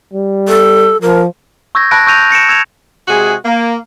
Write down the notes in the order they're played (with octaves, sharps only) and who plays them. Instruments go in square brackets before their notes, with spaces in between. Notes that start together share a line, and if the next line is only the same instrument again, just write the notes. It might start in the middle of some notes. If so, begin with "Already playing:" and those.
[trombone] G3
[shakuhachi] A4
[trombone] F3 [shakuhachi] A#4
[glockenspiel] C#6 E6 G6 G#6 A#6
A5 B5 F#6 A#6 D7
C#6 E6 G6 A#6 D#7 F7
A#6 C#7 D7 E7
E6 G#6 E7 F7
[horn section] C3 G#3 F#4 G#4
A#3